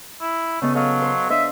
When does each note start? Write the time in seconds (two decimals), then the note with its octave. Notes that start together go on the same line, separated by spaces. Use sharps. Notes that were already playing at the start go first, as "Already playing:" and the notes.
0.21 E4
0.62 C#3 A3 B3 D#5
0.75 F#3 A4 D#5 F5
1.02 C5
1.30 D4 C5 D#5 E5